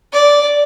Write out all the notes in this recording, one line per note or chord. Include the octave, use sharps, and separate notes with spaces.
D5